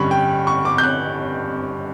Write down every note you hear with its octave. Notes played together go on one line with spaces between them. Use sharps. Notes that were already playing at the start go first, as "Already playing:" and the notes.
Already playing: G2 D3 G3 C#4 B5 C#6
G5
C#6
D6
G6
F#6